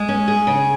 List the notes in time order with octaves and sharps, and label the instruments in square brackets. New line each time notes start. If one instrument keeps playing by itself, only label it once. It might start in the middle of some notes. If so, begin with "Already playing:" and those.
Already playing: [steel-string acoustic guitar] G#3
C#4
G#4
C#3